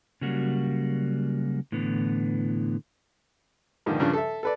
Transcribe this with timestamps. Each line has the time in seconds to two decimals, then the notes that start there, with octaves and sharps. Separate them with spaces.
0.21 C#3 F#3 G3 A#3 F#4
1.72 A2 D3 E3 B3
3.86 G2 A#2 D3 D#3 F3 G#3
4.00 G2 C#3 F3 D4
4.13 A4 E5
4.43 A4 B4 D5